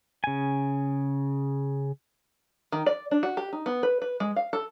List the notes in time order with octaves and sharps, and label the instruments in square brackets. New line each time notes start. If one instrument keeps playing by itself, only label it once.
[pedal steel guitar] C#3 G#5
[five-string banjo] D#3
D5
D4
F#4
G4
D#4
B3
B4
B4
G#3
F5
A4